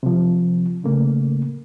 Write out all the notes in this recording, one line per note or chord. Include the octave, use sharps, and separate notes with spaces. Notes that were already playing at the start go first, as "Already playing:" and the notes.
C3 F3
A2 C#3 A3 A#3